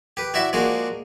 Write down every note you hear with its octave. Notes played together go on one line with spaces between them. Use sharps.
G4 B4
E4 F#4 D5 E5
F3 G#3 A#3 D4 F#4